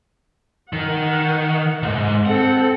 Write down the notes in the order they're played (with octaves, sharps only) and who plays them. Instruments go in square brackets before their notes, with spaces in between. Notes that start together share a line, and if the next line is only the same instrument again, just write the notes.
[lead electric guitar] D#3 [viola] F#5
[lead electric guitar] C2 G#2
[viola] C4 A4 [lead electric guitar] F#5